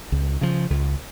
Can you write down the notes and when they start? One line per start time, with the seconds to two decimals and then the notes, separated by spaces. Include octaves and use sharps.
0.12 C#2
0.41 C#3 F3
0.70 C#2